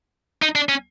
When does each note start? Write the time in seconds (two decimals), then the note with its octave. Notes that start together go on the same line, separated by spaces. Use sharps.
0.42 D#4
0.55 D4
0.69 C#4